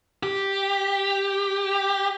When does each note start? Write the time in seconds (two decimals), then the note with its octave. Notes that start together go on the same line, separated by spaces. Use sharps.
0.23 G4